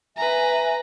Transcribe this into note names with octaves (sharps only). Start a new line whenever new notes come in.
B4 E5 G#5 A#5